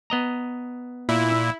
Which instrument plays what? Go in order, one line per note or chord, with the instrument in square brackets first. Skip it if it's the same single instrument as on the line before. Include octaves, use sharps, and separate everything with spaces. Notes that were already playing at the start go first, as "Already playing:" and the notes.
[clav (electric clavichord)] B3 D#5 A#5
[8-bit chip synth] A#2 [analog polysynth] E4